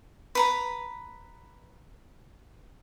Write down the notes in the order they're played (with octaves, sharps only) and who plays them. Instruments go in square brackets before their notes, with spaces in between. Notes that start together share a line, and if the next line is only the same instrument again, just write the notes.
[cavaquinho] B4 A#5 B5